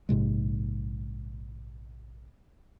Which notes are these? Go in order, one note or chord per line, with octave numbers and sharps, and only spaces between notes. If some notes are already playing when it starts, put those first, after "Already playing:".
A#1 G#2 C3 G#3